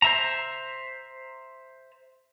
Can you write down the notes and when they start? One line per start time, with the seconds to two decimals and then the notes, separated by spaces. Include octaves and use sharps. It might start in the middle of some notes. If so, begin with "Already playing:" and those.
0.02 C5 E5 A#5